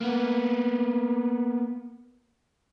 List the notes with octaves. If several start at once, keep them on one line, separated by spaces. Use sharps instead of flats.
A#3 B3